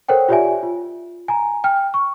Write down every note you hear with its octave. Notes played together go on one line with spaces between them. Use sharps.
A4 A#4 C5 C#5 F#5 G5
F4 G4 C#5 D5 E5 G#5
F4
G#5 A#5
G5 F6
C#6